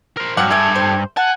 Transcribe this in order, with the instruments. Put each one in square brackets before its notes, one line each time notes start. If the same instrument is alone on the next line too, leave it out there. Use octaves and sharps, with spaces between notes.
[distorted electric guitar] A#4 C5
[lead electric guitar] G2 [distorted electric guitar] F#3 [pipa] C4 F5 F#5
[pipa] G3 A3 G#4 [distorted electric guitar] A4 G5 [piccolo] G#6
[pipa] C5
[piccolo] F#5 [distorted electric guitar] G#5 [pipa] A5